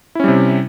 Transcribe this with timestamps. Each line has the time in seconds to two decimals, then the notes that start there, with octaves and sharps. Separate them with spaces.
0.15 E4
0.20 C#4
0.24 G3
0.28 C3